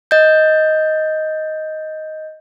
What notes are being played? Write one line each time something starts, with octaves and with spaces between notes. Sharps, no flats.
D#5 G6